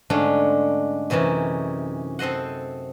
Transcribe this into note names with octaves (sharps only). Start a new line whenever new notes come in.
G#2 D3 G#3 A3 C#4 D4
F#2 C3 E3 C#4 D#4
C4 A4 C5 D#5 F#5